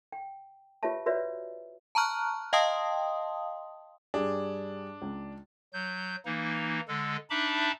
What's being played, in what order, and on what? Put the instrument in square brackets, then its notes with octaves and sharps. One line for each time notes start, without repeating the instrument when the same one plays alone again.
[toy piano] G5
F4 G4 B4 C#5 E5 A5
F4 F#4 B4 C#5 D5 E5
[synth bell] A5 A#5 C#6 F6 F#6
D#5 F5 G5 A5 C6 D#6
[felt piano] G2 G3 G#4 [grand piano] D4
[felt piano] C#2
[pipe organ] F#3 G6
E3 A#3 D#4
D3 G#3 A4
D4 D#4 E5 A5 B5 D6